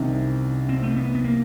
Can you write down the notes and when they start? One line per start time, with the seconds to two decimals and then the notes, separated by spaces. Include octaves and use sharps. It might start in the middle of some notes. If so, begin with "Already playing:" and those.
Already playing: C2 C3 D#3 C#4
0.69 C4
0.83 A3
0.89 A#3
0.97 B3
1.15 B3
1.24 A#3